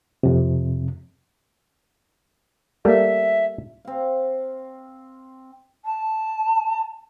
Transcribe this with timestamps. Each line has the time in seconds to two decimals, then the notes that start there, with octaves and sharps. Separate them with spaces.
0.23 F2 C3
2.85 G3 A3 A#3 E5
3.85 C4 F5
5.85 A5